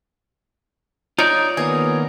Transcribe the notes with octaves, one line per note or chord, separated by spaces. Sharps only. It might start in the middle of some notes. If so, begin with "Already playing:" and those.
D#4 F4 C#5 D5
D#3 A#3 B3 G#4